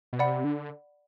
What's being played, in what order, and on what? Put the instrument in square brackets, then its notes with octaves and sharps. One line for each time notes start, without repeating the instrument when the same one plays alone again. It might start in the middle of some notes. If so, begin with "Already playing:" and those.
[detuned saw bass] B2
[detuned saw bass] C3 [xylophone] D5 F#5 B5
[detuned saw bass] D3